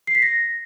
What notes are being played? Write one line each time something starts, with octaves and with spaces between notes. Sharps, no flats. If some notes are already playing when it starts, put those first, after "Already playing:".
C7
B6
A#6